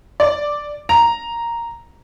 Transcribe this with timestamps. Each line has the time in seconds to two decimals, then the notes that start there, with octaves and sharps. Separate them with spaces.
0.20 D5
0.89 A#5